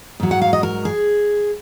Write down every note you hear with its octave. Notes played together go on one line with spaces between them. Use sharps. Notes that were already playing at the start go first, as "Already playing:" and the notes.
G#2 F#3
F#5
F5
D#5
A#4
G#4